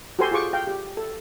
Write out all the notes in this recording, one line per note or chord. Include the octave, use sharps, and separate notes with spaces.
F#4 G4 A4 C5 G#5 C6
F4 G#4 C5 C#6 D6
F5 G5
G4
A4